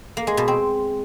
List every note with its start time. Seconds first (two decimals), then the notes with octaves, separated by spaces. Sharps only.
0.17 A#3
0.27 G#3
0.37 B2
0.48 C4